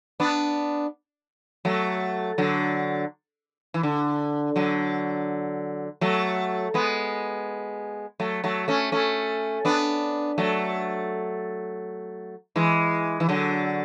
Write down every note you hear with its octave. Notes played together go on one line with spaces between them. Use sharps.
B3 D4
F#3 A3
D3 F#3
E3
D3
D3 F#3
F#3 A3
G#3 B3
F#3 A3
F#3 A3
A3 C#4
A3 C#4
B3 D4
F#3 A3
E3 G#3
E3
D3 F#3